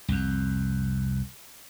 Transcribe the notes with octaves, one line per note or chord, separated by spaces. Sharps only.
C2 F2